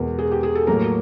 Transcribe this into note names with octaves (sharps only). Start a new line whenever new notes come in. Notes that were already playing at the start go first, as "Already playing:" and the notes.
Already playing: E2 B2 G#3 A#4
G#4
G4
G#4
A4
A2 F#3 A#3 A#4